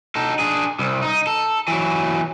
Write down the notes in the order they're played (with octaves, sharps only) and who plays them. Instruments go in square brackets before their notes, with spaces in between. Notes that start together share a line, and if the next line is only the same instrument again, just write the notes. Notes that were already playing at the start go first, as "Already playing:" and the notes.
[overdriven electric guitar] D#4 A4
D4 G#4
C2
D#4
A4
E3 F#3